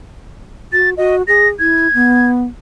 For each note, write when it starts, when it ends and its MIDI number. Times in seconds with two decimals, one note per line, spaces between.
0.73 0.94 66
0.73 0.90 93
0.97 1.22 66
0.97 1.16 75
1.28 1.49 68
1.28 1.48 94
1.59 1.88 64
1.59 2.30 92
1.94 2.44 59